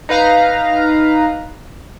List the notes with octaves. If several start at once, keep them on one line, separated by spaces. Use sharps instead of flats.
D#4 B4 F5 A#5